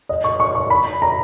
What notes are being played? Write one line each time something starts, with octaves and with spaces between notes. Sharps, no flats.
D#5
C#6
C#6
C#6
B5
A#5